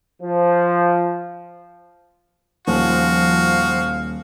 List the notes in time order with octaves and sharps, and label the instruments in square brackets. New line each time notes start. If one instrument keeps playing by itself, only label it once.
[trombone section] F3
[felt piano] D#1 [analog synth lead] F3 [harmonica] F#4 [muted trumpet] F5